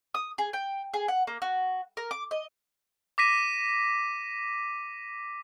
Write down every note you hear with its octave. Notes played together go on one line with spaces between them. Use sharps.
D#6
G#4
G5
G#4
F#5
A#3
F#4
A#4
D6
D#5
D6 A#6 B6 D#7